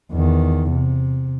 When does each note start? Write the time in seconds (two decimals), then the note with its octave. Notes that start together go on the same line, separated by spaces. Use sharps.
0.13 E2 D#3
0.70 C3